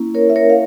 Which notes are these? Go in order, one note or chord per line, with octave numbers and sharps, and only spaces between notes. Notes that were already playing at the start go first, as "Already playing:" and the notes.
Already playing: A#3 C#4 E4
A#4 C#5
E5
A#4 C#5
F5